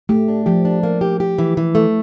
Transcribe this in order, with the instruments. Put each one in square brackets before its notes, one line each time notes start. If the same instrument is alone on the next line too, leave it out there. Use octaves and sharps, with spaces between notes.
[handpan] A3 [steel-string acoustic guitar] G4
[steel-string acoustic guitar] D4
[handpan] F3 [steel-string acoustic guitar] G4
[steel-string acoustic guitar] D4
A#3
G4
G4
E3
E3
A3